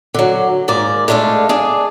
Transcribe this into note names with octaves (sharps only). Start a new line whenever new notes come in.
D3 F#3
D#2 G#2 A#3 D5
G#3 A3 D4 A4 F5
D4 G#4